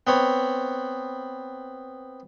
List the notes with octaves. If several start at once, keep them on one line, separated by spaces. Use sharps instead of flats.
B3 C4 C#5